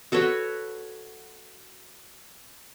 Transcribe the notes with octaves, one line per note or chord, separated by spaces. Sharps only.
F#4 A4 B4 C#5